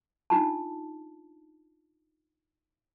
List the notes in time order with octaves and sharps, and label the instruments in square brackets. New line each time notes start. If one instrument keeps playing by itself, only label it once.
[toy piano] D4 D#4 F4 A5